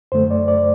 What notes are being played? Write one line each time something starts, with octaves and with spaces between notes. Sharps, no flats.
F#2 D3 A3 C5
D5
D5